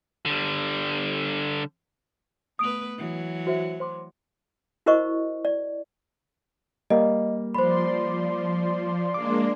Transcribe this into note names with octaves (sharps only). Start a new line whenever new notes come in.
D3 G3
A3 B3 B4 D#6 D7 F7
E3 F#3
F#4 C5 E5
C5 C6 D6
E4 F#4 A#4 C5 D#5 C#6
D5
G3 A#3 D#5
F3 C5 D5 B5 C6
G#3 A#3 D4 D6